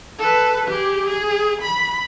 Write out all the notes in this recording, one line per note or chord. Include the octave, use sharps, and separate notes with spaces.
A4 B4
G4 G#4
G#4
B5